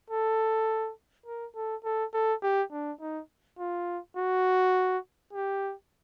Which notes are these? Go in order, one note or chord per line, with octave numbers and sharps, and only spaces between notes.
A4
A#4
A4
A4
A4
G4
D4
D#4
F4
F#4
G4